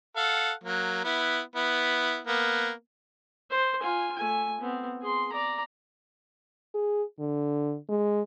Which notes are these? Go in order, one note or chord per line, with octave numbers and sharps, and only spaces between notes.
A4 F5 F#5
F#3 A#3
B3 E4
B3 E4
A#3 B3
C5
F4 G#5
A3 G#5
B3 C4
G#4 C6
D5 A#5
G#4
D3
G#3